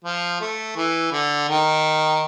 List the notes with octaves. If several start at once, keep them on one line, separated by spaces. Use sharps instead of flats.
F3
A3
E3
D3
D#3